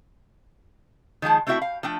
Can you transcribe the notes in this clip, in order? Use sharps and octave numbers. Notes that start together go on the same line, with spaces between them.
D#3 F3 G#3 A5
A3 C4 E4 F#4 E5 G5
F5
F3 A3 D4 G5